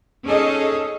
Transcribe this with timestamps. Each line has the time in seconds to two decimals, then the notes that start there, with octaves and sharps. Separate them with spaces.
0.24 C#4 D#4 G#4 A4 D#5